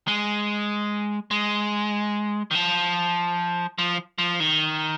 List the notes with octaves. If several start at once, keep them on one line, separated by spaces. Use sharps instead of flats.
G#3
G#3
D#3
F3
F3
F3
D#3